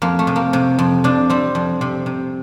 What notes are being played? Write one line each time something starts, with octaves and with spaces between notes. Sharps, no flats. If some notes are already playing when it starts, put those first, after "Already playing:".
F2 A#3
A3
C3
A#3
C3
F2
C3 D4
G3 C4
F2
C3
C3